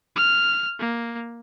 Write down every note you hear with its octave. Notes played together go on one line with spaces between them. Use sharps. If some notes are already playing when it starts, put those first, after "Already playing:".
F6
A#3